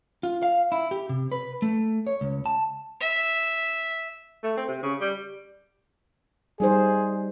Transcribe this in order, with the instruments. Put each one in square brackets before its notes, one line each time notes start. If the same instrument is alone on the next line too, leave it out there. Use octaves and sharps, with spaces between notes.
[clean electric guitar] F4
F5
E4
G4
C3
B4
A3
C#5
C#2
A5
[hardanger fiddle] E5
[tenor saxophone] A3
C4
C3
C#3
G3
[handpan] G3 D#4 C5 [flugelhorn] G#4